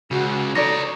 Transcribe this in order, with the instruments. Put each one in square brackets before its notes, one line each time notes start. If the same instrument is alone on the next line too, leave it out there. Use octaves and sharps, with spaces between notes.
[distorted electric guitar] C#2 C#3 [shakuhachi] F#4
[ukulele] D#4 A4 D5 [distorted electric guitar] B4 C#5 [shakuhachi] A#5 [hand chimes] A#6